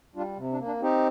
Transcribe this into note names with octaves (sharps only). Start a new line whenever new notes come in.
G3 D4 F4
C3
D4
A#3
D4
C4 D#4 G4